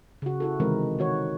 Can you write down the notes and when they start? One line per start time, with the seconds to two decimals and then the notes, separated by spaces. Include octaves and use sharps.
0.22 C#3 F#4
0.40 E4 F#4 A4
0.60 C3 D#3 E3 G#3 C4 A#4
0.99 D#3 F#4 C#5